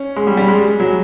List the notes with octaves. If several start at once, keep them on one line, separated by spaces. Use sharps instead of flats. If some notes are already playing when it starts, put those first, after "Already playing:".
Already playing: C#4
G#3
G3
G3
G#3
F#3